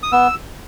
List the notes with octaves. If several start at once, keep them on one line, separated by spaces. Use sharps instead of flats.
D#6
B3 E6